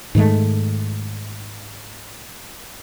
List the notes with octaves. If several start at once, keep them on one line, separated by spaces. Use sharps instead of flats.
G#2 D#3 G#3 A3